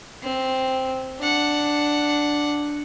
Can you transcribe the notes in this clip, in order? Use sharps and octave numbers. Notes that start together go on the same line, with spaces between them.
C4
D4 F#5